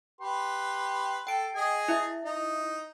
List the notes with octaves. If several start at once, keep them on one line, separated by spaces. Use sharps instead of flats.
G4 B4 C6
A4 G5 D7
G#4 D#5 G#5
E4 E5
D#4